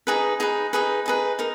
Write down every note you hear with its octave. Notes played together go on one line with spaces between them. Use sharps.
D#4 G#4 B4
D#4 G#4 B4
D#4 G#4 B4
D#4 G#4 B4
D#4 A#4